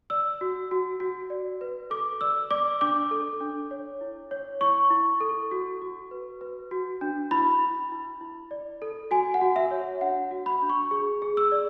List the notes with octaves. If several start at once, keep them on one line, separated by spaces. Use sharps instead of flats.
D5 E6
F#4
F#4
F#4
D5
B4
A4 D6
D5 E6
D5 D6
D4 D6
A4
D4
C#5
E4
C#5
E4 C#6
E4
A4
F#4
F#4
B4
B4
F#4
D4
E4 B5
E4
E4
E4
D5
A4
F#4 G#5
F#5
F#4
E5
C#5
D4 F#5
F#4
B5
D4
C#6
G#4
G#4
E6
D5